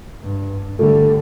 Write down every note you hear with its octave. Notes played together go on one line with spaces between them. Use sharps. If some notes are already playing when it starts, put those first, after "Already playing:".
G2
D3 G3 A3